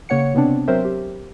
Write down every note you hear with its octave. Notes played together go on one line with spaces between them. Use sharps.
C#3 A#3 C#5 F#5 C#7
C3 B3 C4 D4
F#3 C4 A#4 C5 E5
G4